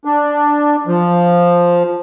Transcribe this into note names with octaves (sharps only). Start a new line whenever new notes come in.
D4
F3